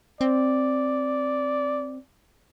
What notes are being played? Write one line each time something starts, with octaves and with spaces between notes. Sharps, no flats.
C4 D5